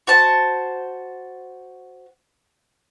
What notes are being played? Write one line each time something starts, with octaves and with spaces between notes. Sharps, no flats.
F#4 C5 A5